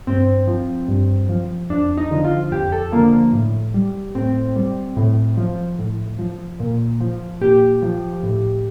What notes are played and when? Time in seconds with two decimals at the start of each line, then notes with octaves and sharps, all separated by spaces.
0.07 G2 C4
0.47 F3
0.88 G2
1.29 F3
1.70 F2 D4
1.98 D#4
2.11 D3 F3
2.25 F4
2.52 F2 G4
2.72 A4
2.92 D3 F3 A#3
3.13 A#3
3.33 A2
3.74 G3
4.15 A2 C4
4.56 G3
4.97 A2
5.37 F3
5.79 A2
6.19 F3
6.60 A#2
7.01 F3
7.41 A#2 G4
7.82 F3
8.23 A2